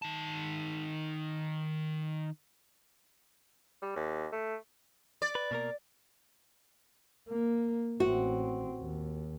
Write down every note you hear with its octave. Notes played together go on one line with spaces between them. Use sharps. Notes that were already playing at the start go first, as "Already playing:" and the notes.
D#3 A5
G3
D#2
A3
D5
B4
B2 A#3 A#4
A#3
A1 C4 F#4
D#2